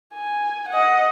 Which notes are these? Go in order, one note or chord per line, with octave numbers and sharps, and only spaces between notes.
G#5
D#5 F#5